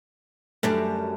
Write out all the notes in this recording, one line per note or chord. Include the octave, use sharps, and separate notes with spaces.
F#2 G3 A3 D4